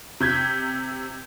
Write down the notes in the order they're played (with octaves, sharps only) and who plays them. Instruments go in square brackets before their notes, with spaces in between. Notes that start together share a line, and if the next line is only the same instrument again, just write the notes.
[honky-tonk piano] C3 G6 G#6 B6